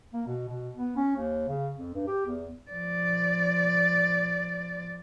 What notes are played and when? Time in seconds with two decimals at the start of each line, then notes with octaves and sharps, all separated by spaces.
0.13 A#3
0.27 B2
0.48 B2
0.75 B3
0.97 C#4
1.16 D#2
1.48 C#3
1.77 F2
1.94 G2
2.07 G4
2.26 E2
2.71 F3 D5